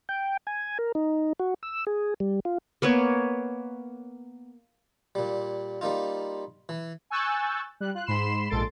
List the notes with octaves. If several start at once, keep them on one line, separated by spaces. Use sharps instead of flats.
G5
G#5
A#4
D#4
F#4
E6
G#4
G3
F4
A#3 B3 B4 C#5
A#2 G3
G3 A#3 D#4 F4
E3
G#5 C#6 E6 F#6 G6 A6
G3 F#6
F4 F#6
G#2 B5 C6 C7 E7
A#1 G#2 A4 C6 A6 D7